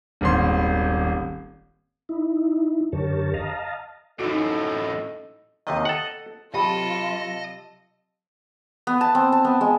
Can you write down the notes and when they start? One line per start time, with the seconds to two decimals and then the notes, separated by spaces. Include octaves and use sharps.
0.21 D#1 G#1 C6
2.09 D#4 E4
2.92 F#2 D3 G4 A#4 C#5 A5
3.34 D#5 F5 A5 A#5
4.20 F#2 A2 D#4 F#4 A4 D#5
5.67 D#2 C3 D#3 D#5
5.85 A4 F#5
6.54 C3 F#3 F4 G4 A4 D#5 G5 B5
8.87 B3
9.01 A5
9.15 C4
9.32 A5
9.45 B3
9.61 G#3